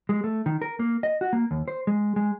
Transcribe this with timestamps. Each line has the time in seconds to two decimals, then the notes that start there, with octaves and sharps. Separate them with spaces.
0.09 G#3
0.24 A3
0.46 D#3
0.62 A#4
0.79 A#3
1.03 D#5
1.21 F#4
1.33 A#3
1.51 D#2
1.68 C5
1.87 G#3
2.16 G#3